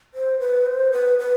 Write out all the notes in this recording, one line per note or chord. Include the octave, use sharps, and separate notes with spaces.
C5
B4
C5
B4
B4